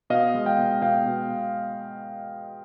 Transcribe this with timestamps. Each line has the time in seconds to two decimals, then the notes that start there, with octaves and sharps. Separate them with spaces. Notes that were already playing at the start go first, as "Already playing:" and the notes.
0.10 B2 D#5 F5
0.34 G#3
0.46 F5 G5
0.58 B2
0.82 B2 F5 G5
1.06 B2